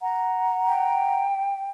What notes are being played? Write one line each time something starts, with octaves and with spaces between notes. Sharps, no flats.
F#5 A#5
G5